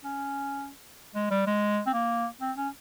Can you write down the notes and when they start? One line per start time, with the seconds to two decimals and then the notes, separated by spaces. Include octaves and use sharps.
0.04 C#4
1.15 G#3
1.31 G3
1.47 G#3
1.87 C4
1.93 A#3
2.41 C4
2.57 C#4